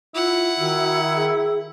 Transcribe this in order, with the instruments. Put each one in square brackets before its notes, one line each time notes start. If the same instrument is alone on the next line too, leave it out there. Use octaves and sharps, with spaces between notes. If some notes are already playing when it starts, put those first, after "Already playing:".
[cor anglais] E4 [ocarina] F4 [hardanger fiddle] F#5
[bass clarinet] D#3 [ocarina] F#4
[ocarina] G#4